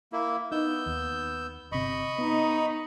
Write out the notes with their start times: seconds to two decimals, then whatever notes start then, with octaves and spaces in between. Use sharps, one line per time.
0.12 A#3 E4
0.52 B3 D#4 E6 G6
0.86 D#2
1.72 G1 C3 D#5 B5 C#6
2.18 B3 D#4